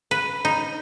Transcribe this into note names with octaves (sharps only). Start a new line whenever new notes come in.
B4
D#4